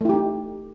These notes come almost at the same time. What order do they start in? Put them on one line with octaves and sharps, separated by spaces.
A3 E4 G4 D#4